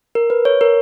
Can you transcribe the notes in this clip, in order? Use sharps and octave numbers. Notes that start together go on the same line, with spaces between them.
A#4
B4
C#5
A#4